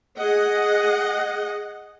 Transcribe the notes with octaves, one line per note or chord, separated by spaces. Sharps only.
G#4 D#5 F#5